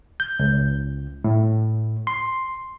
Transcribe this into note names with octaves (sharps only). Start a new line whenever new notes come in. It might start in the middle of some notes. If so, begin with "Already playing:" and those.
G6
C#2
A2
C6